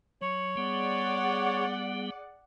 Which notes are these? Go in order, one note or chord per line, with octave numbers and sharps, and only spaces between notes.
F#3 C#5
G3 B3 G#4 D5 F#5